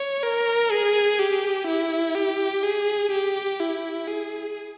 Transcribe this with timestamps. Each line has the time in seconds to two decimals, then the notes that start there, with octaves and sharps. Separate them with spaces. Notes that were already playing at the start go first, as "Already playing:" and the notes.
Already playing: C#5
0.23 A#4
0.71 G#4
1.19 G4
1.67 E4
2.15 G4
2.63 G#4
3.12 G4
3.60 E4
4.08 G#4